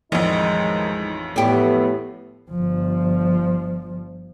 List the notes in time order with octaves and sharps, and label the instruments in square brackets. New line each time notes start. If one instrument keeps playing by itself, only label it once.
[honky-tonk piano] A1 F2 [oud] D#3 [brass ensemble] G#3 D#4
[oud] A2 G4 [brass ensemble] A3 B3
[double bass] G1 F3